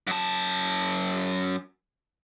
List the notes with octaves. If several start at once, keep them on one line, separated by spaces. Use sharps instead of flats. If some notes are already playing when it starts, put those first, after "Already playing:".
F#2 A5